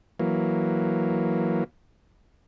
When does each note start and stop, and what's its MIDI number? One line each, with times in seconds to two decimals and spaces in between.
0.19 1.64 52
0.19 1.64 54
0.19 1.64 58